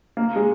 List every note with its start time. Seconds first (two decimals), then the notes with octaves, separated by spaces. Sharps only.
0.17 A#3
0.36 G#3